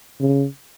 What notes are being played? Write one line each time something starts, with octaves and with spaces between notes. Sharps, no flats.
C#3